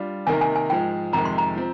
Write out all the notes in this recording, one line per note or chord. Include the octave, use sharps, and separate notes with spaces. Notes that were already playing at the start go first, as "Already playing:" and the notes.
Already playing: G3 D4 F4
C3 D#3 A#3 D#4 A#4 G#5
G#5
G#5
G#2 F3 G#3 G5
F2 C3 D#3 G#3 A#5
C6
A#5
F3 C4